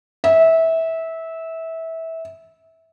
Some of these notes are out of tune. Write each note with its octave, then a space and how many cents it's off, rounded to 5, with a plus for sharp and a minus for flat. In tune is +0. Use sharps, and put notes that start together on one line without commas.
E5 -20